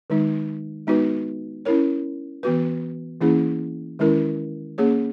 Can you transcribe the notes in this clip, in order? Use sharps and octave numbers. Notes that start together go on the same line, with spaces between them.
D#3 G#3 D#4
G#3 B3 D#4 F#4 B4
C#4 E4 A#4 C#5
E3 B3 F#4 B4
E3 A#3 C#4 E4 G#4
D#3 G#3 C#4 E4 A#4
A#3 C#4 G#4 C#5